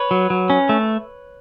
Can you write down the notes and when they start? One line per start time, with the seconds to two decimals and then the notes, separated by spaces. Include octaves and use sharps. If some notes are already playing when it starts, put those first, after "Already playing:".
Already playing: B4 C#5
0.11 F#3
0.30 F#3
0.50 C#4
0.69 A3